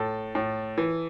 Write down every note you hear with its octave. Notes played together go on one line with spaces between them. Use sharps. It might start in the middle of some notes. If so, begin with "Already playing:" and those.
Already playing: A2 A4
A2
E3